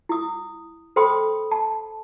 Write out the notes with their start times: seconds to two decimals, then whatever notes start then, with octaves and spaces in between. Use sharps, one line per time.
0.09 E4 D#6
0.96 A4 C5 G5 B5 C6 D#6
1.52 A5